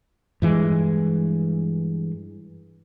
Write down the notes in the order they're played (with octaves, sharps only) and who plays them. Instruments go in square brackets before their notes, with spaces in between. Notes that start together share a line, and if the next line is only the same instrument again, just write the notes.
[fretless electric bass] G2 E3 G#3